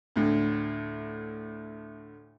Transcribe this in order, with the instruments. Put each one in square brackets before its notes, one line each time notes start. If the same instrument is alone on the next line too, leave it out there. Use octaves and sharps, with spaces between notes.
[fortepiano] D2 A2